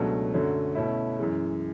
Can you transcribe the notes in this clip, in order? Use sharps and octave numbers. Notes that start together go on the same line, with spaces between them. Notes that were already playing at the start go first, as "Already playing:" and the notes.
Already playing: C#2 B2 F#3 A3 D4
F#2 D3 F#3 A3
B2 A3 C#4 E4
F#2 E3 G#3